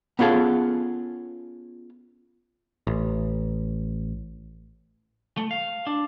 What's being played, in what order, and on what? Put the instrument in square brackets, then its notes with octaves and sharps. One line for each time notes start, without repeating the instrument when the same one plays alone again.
[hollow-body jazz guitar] B3 C#4 F4 G#4 A4
[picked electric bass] A1
[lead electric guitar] A3
F5
D4